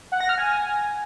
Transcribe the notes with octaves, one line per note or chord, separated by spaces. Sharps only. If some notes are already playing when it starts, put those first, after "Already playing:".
F#5
A#6
F6
G#5